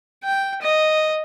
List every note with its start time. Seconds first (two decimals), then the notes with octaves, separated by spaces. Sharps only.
0.24 G5
0.62 D#5